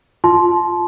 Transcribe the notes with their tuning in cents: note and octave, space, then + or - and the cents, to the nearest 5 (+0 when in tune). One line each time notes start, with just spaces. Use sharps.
F4 +0 A5 -25 C6 +5